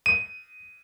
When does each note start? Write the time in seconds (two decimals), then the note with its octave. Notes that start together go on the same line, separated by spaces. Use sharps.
0.06 D#7